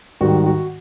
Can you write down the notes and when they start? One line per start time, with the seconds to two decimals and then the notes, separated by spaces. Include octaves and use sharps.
0.21 G#2 D#3 G3 F#4
0.46 F#4